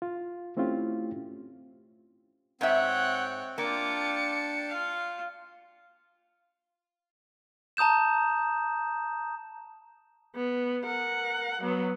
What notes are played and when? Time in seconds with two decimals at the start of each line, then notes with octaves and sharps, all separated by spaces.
0.02 F4
0.57 A3 C4 C#4 E4 F4 G4
2.61 G#2 C4 C#5 E5 F#5 G5
3.58 A#3 D4 F4 G5 A5 D6 C#7
4.69 F4 F5
7.77 A5 A#5 D#6 G6 E7
10.35 B3
10.85 A#4 F#5
11.61 F#3 B3